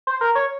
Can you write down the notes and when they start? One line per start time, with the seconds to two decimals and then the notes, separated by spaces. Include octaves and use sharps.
0.07 C5
0.21 A#4
0.35 C#5